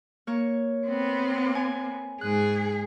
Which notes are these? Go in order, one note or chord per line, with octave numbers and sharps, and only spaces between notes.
A#3 C#5
B3 C4
G#5
G#2 G#4 F#6